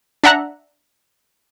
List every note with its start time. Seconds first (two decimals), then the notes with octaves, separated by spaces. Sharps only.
0.24 D4 E5 F#5 A#5 F#6